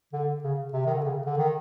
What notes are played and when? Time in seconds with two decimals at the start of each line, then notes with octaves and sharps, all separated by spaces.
0.13 D3
0.43 C#3
0.73 C3
0.86 D#3
0.94 D3
1.04 C#3
1.26 D3
1.37 D#3